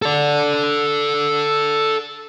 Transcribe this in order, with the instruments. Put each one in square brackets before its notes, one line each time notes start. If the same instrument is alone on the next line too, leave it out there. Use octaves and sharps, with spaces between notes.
[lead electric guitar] A4 D5